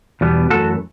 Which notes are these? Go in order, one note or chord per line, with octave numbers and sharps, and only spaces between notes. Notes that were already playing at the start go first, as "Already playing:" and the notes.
E2 B2 G3 B3
F#2 E3 A3 F#4 A4